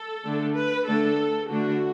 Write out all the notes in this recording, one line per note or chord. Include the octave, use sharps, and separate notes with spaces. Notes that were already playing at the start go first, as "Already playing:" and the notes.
Already playing: A4
D3 A3 D4
B4
D3 A3 D4 A4
D3 A3 D4 F#4